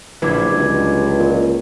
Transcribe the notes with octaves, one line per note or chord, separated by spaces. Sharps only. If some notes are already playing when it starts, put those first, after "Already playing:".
A#1 D3 F#3 E4 B4 D6 G#6
C#2 G2
A#2